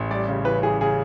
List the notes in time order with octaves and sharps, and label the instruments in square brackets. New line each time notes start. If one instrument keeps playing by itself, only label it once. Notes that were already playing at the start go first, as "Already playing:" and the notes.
Already playing: [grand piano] A1
[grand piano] G3 [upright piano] D5
[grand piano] C#3
[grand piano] E3 [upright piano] B4
[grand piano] E3 [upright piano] G#4
[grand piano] C#3 [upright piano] G#4